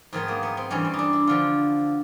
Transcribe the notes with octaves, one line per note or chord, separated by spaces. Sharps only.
G#2 D#3 F#3 B3
A#3
B3
C4
G2 E3 C#4
D4
D#4
D4
E4
D3 F3 F4